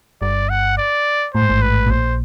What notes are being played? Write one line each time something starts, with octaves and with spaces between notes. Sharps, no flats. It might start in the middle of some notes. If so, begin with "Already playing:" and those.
G1 G2 D5
F#5
D5
A2 C5
G#2
A1 A2
B4
A2
A#1 A#2 C5